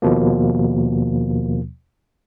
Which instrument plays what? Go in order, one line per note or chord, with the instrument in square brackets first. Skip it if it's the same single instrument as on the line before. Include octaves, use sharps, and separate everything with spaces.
[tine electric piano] D#2 B2 F3 A#3